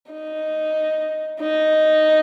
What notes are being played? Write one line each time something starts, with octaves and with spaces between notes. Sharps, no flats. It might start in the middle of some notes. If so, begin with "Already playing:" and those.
D#4
D#4